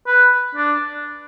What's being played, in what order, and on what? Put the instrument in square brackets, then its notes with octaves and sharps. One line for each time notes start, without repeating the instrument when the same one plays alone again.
[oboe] B4
D4